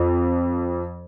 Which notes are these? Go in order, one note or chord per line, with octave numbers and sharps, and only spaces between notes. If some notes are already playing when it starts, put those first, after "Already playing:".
Already playing: F2